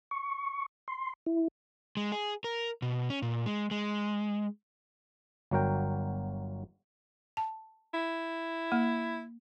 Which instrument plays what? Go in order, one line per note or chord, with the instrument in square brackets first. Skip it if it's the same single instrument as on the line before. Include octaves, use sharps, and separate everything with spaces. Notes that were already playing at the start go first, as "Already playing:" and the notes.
[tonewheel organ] C#6
C6
E4
[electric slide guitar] G#3
G#4
A#4
B2
C#4
A#2
G#3
G#3
[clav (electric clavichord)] G1 F#3 F#4 A#4 G5
[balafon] A5
[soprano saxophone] E4
[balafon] A#3